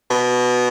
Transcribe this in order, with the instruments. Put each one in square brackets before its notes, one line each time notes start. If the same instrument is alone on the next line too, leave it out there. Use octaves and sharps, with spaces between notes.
[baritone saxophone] B2